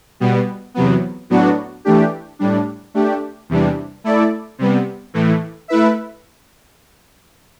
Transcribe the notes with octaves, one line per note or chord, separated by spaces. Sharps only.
B2 G3 B3
E2 C3 F#3 B3
A2 F#3 B3 D4 F#4
E3 A3 D4 G4
A2 G3 D4
A3 D4 G4
E2 C3 E3 G3 D4
A3 E4 A4 D5
C3 G3 B3
A2 E3 A3
A3 E4 B4 E5